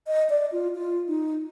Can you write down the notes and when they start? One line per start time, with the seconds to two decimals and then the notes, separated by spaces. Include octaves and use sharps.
0.07 D#5
0.30 D5
0.52 F4
0.75 F4
1.08 D#4